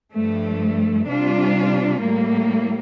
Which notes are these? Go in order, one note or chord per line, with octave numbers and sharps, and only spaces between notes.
G2 F3 A3
C3 G3 D4 F4
A2 G3 A#3